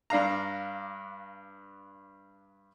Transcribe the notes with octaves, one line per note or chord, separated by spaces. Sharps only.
G2 D4 F5 A#5